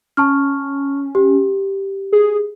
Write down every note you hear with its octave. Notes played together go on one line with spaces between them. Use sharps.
C#4 A5 C#6 F6
G4
G#4